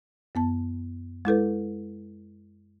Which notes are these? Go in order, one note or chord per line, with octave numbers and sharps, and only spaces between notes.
F#2 B3 A5
G#3 E4 A4 B4